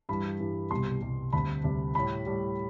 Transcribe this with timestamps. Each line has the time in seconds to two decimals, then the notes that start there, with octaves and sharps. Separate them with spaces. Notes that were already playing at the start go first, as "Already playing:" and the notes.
0.09 G2 E3 G3 B5
0.40 G2 E3 G3
0.71 C2 B2 G3 C6
1.02 C2 B2 G3
1.33 D2 C3 G3 B5
1.64 D2 C3 G3
1.95 A2 G3 B5
2.26 A2 G3